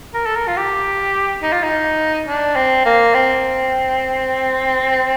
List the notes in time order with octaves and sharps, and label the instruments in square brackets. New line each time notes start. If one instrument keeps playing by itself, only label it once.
[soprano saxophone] A#4
A4
A#4
F4
G4
D#4
F4
D#4
D4
C4
A#3
C4